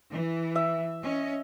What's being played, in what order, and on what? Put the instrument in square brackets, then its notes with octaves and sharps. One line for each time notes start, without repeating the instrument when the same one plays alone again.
[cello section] E3
[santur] E5
[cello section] C#4 D#5